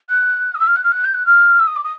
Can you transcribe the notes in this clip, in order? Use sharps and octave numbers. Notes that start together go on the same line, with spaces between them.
F#6
D#6
E6
F6
F#6
F6
F#6
G6
F#6
F6
E6
D#6
D6
D#6